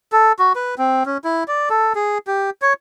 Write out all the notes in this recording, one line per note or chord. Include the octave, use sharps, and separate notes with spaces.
A4
F#4
B4
C4
C#4
E4
D5
A4
G#4
G4
C#5